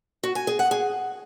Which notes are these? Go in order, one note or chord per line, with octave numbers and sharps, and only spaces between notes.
F#4
G#5
G#4
F#5
G#4